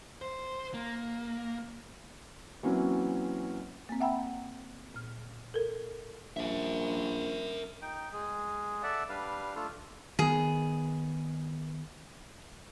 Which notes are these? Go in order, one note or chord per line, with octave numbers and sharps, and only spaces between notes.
C5
A#3
E3 F#3 A#3 C4 C#4
A#3 C4
E5 F#5 G5 A#5 B5 E6
A#2 F6
A4 A#4
A#1 A#4 E5
D#4 G5
G#3 G#4
A4 D5 E5 F#5
G3 D4 B4 F5
A3 D4 F4 A4
D#3 B3 G#4